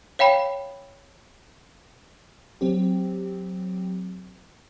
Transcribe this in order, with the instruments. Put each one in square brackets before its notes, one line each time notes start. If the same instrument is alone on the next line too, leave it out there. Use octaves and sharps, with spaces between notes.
[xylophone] C#5 F5 G5 B5 C7
[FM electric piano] F#3 C4 G4